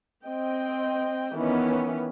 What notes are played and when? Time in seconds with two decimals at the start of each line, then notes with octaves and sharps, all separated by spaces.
0.24 C4 D#5 G5
1.34 D#3 E3 B3 C#4